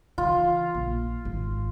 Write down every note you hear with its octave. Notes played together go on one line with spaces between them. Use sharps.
C#3 E3 F4
A#1
G#1